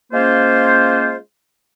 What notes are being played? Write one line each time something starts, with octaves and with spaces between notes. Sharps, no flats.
G#3 A#3 C#4 F4 C5